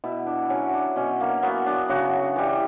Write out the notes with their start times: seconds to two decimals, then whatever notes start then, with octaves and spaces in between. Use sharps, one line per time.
0.04 B2 E4
0.27 D4
0.50 F#3 C#4
0.73 D4
0.96 B2 C#4
1.20 A#3
1.42 F#3 B3
1.66 D4
1.89 C#3 F#4
2.36 E3 G3